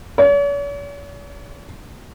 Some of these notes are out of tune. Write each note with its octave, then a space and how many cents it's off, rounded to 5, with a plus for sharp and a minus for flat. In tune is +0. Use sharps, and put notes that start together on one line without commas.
C#5 +45